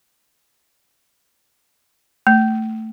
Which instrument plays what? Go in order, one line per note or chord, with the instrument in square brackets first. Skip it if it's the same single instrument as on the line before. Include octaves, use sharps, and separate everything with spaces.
[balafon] A3